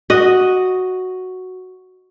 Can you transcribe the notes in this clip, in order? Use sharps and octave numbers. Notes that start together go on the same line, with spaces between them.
F#4 D#5